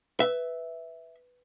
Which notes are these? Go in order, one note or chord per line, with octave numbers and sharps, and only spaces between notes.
B4 E5